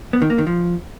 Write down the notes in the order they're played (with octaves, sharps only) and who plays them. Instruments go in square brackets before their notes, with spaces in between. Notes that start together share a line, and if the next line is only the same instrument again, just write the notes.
[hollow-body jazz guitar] B3
D#3
A#3
D#3
F3